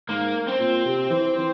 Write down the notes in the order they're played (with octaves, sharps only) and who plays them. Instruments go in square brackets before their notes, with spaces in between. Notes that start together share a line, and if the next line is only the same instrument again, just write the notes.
[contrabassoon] G#2 [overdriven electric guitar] A#3
[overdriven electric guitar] C4
[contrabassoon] A#2
C3
E3
E3